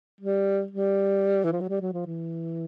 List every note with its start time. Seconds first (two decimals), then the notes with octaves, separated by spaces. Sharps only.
0.21 G3
0.71 G3
1.44 E3
1.52 F3
1.61 F#3
1.69 G3
1.81 F#3
1.93 F3
2.06 E3